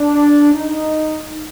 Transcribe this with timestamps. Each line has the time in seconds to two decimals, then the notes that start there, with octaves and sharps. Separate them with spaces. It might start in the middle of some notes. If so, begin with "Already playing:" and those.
Already playing: D4
0.53 D#4